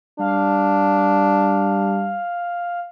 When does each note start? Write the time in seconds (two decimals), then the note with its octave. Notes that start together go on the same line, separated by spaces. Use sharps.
0.20 G3 D4 F5